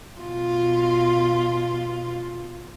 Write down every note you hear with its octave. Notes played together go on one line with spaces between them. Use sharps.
B2 F4